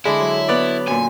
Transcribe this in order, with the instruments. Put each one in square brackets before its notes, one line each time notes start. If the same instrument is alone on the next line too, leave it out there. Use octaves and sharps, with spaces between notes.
[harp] D3 D5 [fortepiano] G#3 [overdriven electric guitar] E4
[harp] F#3
[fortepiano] B3 D5
[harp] F#2 A#2 [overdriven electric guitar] G#5